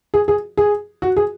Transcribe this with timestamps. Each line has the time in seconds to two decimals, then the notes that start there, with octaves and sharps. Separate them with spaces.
0.14 G#4
0.28 G#4
0.57 G#4
1.02 F#4
1.17 G#4